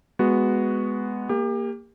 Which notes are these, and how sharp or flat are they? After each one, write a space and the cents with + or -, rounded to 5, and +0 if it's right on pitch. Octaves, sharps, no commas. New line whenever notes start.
G#3 -5 B3 +0 F#4 +0
A#3 +0 G4 +30